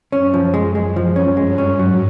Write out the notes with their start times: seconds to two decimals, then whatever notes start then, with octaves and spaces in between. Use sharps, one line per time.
0.12 F#2 C#4
0.34 F3
0.54 G#3
0.75 G#3
0.96 F3
1.16 C#4
1.37 G2 G#3
1.58 C#4
1.79 G#2 F#3